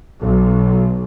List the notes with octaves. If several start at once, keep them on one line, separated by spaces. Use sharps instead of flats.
B1